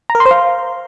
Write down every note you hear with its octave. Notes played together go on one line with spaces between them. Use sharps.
A#5
A#4
C6
C5
F5